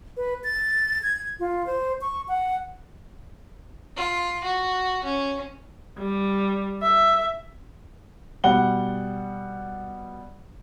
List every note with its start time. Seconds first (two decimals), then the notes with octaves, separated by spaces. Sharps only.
0.17 B4
0.44 A6
1.03 G#6
1.40 F4
1.67 C5
2.01 C#6
2.28 F#5
3.97 F4
4.44 F#4
5.04 C#4
5.99 G3
6.83 E5
8.44 B2 G3 F#5 G7